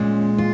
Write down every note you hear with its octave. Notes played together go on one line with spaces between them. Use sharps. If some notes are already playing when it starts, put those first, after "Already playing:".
Already playing: A#2 G#3 C#4
F4